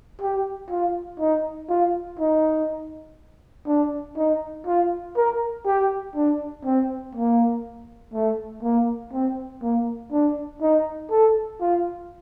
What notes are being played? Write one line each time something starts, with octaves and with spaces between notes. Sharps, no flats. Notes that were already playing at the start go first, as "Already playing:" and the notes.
G4
F4
D#4
F4
D#4
D4
D#4
F4
A#4
G4
D4
C4
A#3
A3
A#3
C4
A#3
D4
D#4
A4
F4